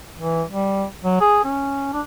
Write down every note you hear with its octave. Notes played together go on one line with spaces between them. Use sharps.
E3
G3
F#3
G#4
C#4
D4